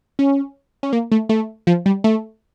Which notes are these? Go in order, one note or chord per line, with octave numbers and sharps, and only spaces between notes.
C#4
C#4
A#3
A3
A3
F3
G3
A3